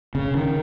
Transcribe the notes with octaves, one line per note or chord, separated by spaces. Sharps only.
C#3
D#3